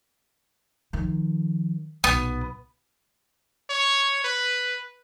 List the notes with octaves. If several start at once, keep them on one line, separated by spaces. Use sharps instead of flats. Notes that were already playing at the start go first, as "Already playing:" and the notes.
D#3 F3
B1 A#2 B3
C#5
B4